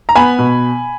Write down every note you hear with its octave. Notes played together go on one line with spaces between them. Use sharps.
A#5
B3 G#5 B5
B2